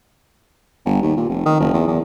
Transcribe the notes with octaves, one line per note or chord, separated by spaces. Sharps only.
G1
D#2
A#2
F1
D#3
F#1
E2
E2